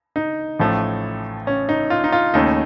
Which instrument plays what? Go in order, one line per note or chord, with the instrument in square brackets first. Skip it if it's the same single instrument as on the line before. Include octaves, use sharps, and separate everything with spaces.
[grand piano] D#4
A1 A2 F3 A3
C#4
D#4
F4
D#4
F4
D#2 C#3 A3 D#4